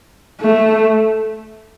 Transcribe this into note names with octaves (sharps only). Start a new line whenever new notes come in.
A3